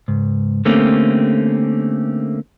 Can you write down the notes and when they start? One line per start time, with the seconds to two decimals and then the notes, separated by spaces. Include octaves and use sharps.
0.08 C#2 G#2
0.65 D3 A3 A#3 C4 C#4 G4